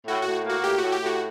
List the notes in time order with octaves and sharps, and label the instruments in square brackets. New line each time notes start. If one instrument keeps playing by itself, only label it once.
[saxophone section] A2 [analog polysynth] F#4
[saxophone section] A2 [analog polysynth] F#4
[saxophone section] A#3 [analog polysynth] F#4
[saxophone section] A2 [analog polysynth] G4
[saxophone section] A2 [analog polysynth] F#4
[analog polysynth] G4
[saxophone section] A2
[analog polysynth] F#4